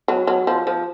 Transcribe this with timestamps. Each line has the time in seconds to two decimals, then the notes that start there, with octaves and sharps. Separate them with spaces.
0.08 F#3
0.27 F#3
0.47 F3
0.67 F3